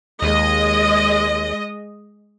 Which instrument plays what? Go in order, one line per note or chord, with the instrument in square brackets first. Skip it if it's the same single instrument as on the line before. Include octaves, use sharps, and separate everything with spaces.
[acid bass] D#2 [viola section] G#3 D#5